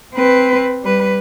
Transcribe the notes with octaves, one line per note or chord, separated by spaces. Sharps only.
C4 B4
G3 B4